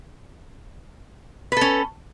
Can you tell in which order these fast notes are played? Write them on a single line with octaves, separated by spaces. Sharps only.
B4 A4 C#4